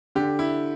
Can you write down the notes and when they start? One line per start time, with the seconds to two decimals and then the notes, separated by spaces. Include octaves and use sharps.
0.15 D3 G4
0.39 E4